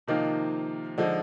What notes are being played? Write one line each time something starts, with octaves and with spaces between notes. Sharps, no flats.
C3 D#3 F3 A#3 F4 C5
D3 F3 G#3 D#4